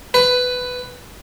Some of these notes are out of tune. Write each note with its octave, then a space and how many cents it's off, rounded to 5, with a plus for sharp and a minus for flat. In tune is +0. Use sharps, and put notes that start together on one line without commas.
B4 +10